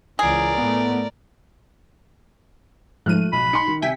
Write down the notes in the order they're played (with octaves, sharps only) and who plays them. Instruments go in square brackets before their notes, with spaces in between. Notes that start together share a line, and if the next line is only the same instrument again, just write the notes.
[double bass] C#2 E3 [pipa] G#4 [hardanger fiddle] A#4 D5
[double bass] A2 A3 [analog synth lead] B3
[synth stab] G#2 F3 D#7 [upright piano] A3 F6 F#6
[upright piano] B1 [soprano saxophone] B5
[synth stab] D#4 [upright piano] C6 C#7
[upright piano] D#3
[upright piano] C3 [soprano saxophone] E5 [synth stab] G5 G#5 B6